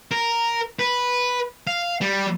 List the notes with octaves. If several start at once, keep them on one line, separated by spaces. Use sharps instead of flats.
A#4
B4
F5
G3